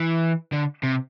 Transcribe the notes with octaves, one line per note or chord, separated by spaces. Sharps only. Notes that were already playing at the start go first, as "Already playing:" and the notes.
Already playing: E3
D3
C3